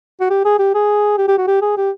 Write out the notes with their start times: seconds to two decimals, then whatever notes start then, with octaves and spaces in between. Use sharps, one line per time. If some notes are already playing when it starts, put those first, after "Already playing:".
0.20 F#4
0.30 G4
0.45 G#4
0.59 G4
0.74 G#4
1.18 G4
1.28 G4
1.38 F#4
1.47 G4
1.62 G#4
1.77 G4